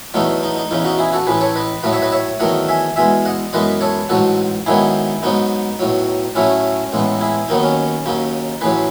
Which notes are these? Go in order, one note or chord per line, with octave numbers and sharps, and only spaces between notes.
E2 B2 F#3 A3 D#4
D#4
D#4
E2 C#3 E3 D#4
D#4 F#4
E4 G#4
F#4 A4
A1 A2 E3 G#4 B4
A4 C#5
B4 D#5
A2 F#3 A3 B4 D#5
C#5 E5
B4 D#5
C#5 E5
E2 D#3 F#3 A3 D#5 F#5
E5 G#5
E2 B2 G#3 E5 G#5
D#5 F#5
F#2 E3 G#3 B3 B4 D#5
A4 C#5
A1 G#2 F#3 F#4 A4
G#2 D#3 F#3 B3 E4 G#4
G#2 F#3 B3 D#4
B1 A2 F#3
A2 F#3 A3 C#4 E4
A1 A2 G#3 B3
E4 G#4
D#2 D#3 F#3 B3 D#4
C#4
D#2 C#3 F#3 D#4
A1 A2 F#3 G#4 B4